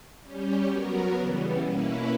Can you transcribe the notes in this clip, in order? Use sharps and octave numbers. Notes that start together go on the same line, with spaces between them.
G3 C#4 G4
F#3 B3 F#4 A#4
C#3 E3 G3 B3
B2 A#3 C#4 E4 B4